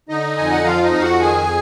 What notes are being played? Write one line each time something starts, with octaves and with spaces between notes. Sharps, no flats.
D3 D#4 D#5
F2 G#5
F#5
F3 F4 F5
D#4 D#5
F2 F5
F#4 F#5
D#3 G#4 G#5